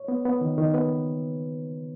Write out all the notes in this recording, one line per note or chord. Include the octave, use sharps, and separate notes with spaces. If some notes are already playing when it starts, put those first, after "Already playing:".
Already playing: C#5
B3
B3
D#3
D#3
B3 B4